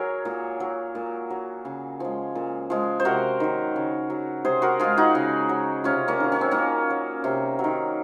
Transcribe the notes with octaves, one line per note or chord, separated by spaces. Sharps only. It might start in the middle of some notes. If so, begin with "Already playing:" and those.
Already playing: F#3 G#4 A#4 C#5
A#2
F#3
A#2
F#3
C#3
F3 G#3
A#2
F3 G#3
C5
C3 F#4 A#4
D#3 F#3
C#3
F#3
C3 G#4 C5
F#4 A#4
F3 G#3 F4 G#4
D#4 F#4
C#3
F#3
C3 C#4 F4
A#3 C#4
D#3 F#3
C#4
C4
A#2 A#3 C#4
F#3
C3
F#3
D#3